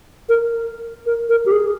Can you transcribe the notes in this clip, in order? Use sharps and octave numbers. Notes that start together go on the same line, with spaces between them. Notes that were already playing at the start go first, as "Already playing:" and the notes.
A#4
A#4
A#4
G4
G#4